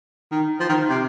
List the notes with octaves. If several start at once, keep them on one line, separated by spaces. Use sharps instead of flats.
D#3
F3
D#3
C3